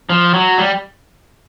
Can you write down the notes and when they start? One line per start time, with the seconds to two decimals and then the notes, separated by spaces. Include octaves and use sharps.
0.10 F3
0.34 F#3
0.58 G3